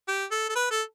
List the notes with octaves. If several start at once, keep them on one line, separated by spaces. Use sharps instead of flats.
G4
A4
A4
B4
A4